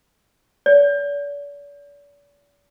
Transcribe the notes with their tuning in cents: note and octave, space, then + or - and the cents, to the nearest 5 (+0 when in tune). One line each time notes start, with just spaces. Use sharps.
D5 -40